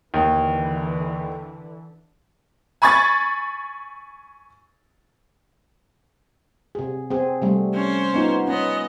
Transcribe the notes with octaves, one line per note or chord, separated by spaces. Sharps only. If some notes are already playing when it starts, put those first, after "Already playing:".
D#2 D3 E3
G#5 B5 C#6 G#6 A6
C3 G#4
C4 G#4
C3 G3 A3
C#4 C5
B3 D#4 F4
B3 C#4 D#5